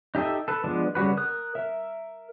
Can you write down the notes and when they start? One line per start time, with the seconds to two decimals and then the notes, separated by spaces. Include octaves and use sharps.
0.15 D#4 G4 A4 D#5 E5
0.48 A4 B4
0.64 F3 G#3 B3 D4
0.95 C#3 G3 F#4 B4
1.17 A#4 D#6 F#6
1.55 A#4 E5